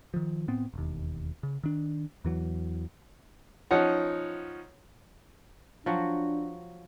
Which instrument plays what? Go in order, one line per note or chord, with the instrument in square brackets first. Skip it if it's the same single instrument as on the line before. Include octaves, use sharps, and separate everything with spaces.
[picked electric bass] D#3 F3
A2 B3 C4
E1 D#2
C#3
D#3 D4
E2 E3 F#3
[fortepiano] F3 C#4 D#4 F#5
[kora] F3 F#3 F#4 [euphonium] D4